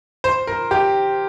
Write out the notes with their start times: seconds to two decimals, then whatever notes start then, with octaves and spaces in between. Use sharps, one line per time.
0.24 C5
0.47 A#4
0.71 G4